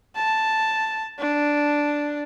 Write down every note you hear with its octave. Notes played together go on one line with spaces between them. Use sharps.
A5
D4